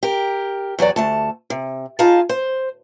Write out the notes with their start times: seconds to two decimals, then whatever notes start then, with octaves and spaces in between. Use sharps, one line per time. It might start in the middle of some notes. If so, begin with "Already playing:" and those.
0.03 G4 A#4
0.79 E2 F#3 F#4 D5
0.96 D2 A3 A5
1.50 C3
1.99 D#4 F4 G#4 F5 A5
2.29 C5